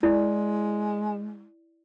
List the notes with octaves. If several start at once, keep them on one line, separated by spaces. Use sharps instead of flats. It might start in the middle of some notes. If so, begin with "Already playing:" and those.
G#3 E4 D5